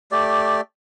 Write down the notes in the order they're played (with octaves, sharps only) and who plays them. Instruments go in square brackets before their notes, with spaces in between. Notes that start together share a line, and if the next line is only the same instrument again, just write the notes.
[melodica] A3 G4 D5